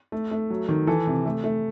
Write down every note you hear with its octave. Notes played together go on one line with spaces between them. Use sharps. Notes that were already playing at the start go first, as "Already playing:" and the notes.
A3
A3
F#3
D#3
E3 A4
C3
A3
A3